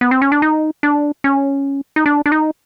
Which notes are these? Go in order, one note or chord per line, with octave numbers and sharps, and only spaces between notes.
B3
C4
C#4
D4
D#4
D4
C#4
D#4
D4
D4
D#4